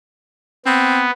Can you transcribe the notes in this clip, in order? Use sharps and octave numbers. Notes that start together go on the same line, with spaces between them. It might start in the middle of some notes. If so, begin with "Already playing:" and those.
B3 C4